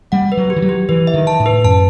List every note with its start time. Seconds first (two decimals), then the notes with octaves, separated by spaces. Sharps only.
0.12 G3 F#5
0.32 B4
0.37 F#3
0.50 G4
0.56 E3
0.62 F#3
0.69 G4
0.89 E3 B4
1.07 E5
1.14 D#3
1.27 A5
1.40 A2
1.46 B4
1.64 F#2 A5